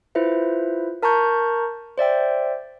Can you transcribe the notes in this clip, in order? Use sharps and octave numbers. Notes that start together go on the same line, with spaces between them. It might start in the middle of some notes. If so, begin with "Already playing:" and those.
E4 F4 B4 C5 E5
A#4 A5 A#5 C#6 G6
C5 D5 E5 G5